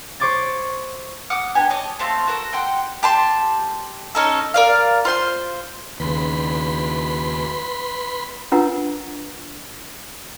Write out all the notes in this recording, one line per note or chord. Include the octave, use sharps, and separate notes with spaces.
C5 C#6 D6 G#6 A6
F#5 D6 D#6 F6
B3 D4 G4 G#5
C#5 D#5 A5 D6
A3 C4 F5 A5
F#4 A4 A#4
F#5 G5 C6
G4 A5 C6
C#4 D#4 A4
A#4 D5 F5
F4 C5 C6
D#2 C#3 B4 B5 C6
D4 F4 A#4 B4 F#5 A#5